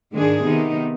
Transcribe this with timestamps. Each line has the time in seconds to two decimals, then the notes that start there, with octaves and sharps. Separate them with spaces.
0.12 G#2 D#3 G#3 D4 G#4
0.44 C3 D#3 B3 D#4